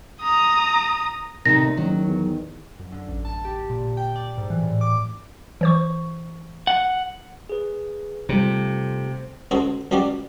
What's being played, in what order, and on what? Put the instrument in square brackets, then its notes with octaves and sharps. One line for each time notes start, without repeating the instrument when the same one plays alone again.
[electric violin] A#5 D#6
[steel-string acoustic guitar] C3 A3 D#4 [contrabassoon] D#3 [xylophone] A#6
[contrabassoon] F#1 [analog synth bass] D#3 [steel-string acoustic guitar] F#3
[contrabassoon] E2
[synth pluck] F#2
D3
A1
A5
G4
A#2
G5
D5
G#2
E3
A2
D6
E3 C5 C#6
[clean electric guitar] F#5
[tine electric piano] G#4 B4
[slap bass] C3 [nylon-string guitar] G3 A3 F4 [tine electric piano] C5
[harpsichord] C#2 F#4 G#4 A4 C5
C#2 G3 F#4 G4 D5